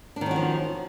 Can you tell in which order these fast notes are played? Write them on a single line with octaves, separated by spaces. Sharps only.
D4 D#3 C#4 F#4 F3